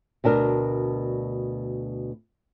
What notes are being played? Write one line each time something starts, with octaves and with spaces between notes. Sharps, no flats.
D2 B2 D4 A#4